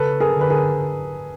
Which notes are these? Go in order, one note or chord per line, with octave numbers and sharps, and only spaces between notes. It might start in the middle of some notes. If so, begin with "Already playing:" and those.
Already playing: C#3 A4 B4
G#4 A#4
D3
B4
G#4 A#4